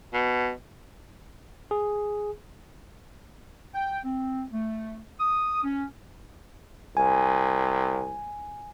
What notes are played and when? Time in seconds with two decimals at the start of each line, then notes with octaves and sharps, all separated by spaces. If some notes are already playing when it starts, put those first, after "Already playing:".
0.13 B2
1.71 G#4
3.74 G5
4.05 C4
4.52 A3
5.20 D#6
5.63 C#4
6.97 C2 G#5